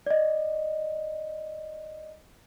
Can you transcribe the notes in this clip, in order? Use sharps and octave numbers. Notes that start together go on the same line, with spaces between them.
D5 D#5